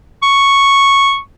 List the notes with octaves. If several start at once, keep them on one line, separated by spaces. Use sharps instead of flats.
C#6